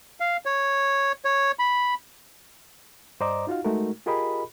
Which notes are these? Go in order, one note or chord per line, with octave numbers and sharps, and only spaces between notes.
F5
C#5
C#5
B5
G2 C5 D5 D#5 A#5 D6
D#4 F4 F#4 F5
G#3 A3 D#4 F#4 A#4
F4 G4 G#4 A#4 D#5 B5